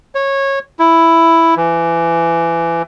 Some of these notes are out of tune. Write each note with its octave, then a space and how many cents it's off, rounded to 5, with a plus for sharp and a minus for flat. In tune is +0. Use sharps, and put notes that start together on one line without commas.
C#5 -15
E4 +5
E3 +25